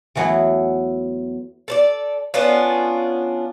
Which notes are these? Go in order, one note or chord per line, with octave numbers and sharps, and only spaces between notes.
E2 E3 F#3 A3 B3 E4
A4 C5 D5
B3 C#4 D4 F4